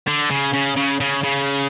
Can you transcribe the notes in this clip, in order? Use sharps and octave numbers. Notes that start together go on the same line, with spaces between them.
D3
C#3
C#3
C#3
C#3
C#3